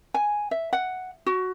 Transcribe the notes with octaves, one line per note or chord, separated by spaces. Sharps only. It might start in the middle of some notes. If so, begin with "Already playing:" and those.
G#5
E5
F#5
F#4